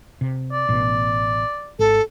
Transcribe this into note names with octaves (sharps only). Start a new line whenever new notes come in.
C3
D5
A1 B2
G#1 A4